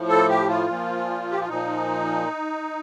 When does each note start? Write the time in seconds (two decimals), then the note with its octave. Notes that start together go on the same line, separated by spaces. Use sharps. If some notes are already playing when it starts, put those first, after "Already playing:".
Already playing: A2 F3
0.08 A4
0.29 G4
0.49 F4
0.68 A#2 F3
1.32 G4
1.41 F4
1.49 A#2 F3 D#4